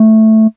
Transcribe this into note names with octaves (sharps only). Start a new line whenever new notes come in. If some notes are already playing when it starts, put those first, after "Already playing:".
Already playing: A3